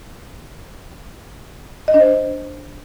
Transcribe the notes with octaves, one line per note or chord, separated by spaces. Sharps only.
D#5
D4
C5